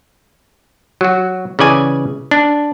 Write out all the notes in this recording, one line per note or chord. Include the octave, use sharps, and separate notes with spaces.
F#3 F#4
C#3 E3 D5 G#5
D4